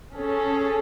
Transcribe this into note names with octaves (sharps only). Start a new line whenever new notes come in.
C#4 G#4 A4